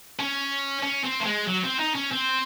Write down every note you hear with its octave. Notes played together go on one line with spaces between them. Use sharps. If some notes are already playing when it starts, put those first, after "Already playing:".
C#4
C#4
C4
A3
G#3
F#3
C4
D#4
C#4
C4